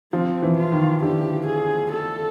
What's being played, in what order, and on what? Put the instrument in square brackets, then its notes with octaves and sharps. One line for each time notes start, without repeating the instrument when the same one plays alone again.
[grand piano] F3 [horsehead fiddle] C4
[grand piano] E3
[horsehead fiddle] F4
[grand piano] D#3
[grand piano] D3 [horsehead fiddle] G4
[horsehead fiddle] G#4
A4